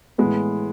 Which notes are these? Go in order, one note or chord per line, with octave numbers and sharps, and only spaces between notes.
A2 E3 G#3 B3